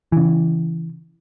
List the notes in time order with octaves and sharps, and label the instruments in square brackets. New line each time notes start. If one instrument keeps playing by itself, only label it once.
[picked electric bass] C#3 E3